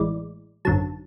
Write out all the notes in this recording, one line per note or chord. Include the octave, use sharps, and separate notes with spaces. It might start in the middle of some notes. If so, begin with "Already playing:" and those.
Already playing: A1 A2 E3 G#3 D5
G#1 F#2 D3 F#3 A5